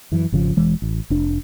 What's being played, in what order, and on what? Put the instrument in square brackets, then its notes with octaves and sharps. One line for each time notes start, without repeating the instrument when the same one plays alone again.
[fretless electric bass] F#2 E3
G#1 C#3 F3
E1 E3 G#3
A1
F1 D4